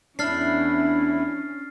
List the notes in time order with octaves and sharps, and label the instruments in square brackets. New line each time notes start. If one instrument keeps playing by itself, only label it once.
[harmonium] E2 E4 [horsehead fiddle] C#4 [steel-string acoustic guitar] D4 [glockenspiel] F6 A6 C7